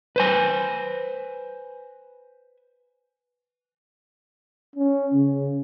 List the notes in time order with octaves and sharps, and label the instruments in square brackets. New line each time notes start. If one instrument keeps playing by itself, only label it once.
[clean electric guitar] B4 C5 G#5
[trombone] C#4
C#3